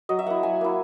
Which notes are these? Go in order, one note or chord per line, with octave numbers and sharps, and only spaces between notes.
F#3 D#5
E5
A#3 E4 F#5
F#3 G#5
A#3 E4